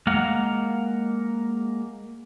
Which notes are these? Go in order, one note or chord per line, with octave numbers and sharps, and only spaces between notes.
G#3 A#3 A#4 F5 F#5